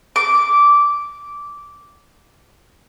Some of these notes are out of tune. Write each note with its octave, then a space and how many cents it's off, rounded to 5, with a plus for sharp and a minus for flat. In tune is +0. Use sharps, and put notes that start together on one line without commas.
D6 -10